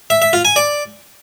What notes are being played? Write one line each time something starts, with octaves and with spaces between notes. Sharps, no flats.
E5
E5
F4
G#5
D5